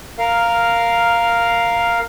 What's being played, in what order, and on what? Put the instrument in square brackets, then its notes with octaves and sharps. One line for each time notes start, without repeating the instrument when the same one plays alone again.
[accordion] A#4 F5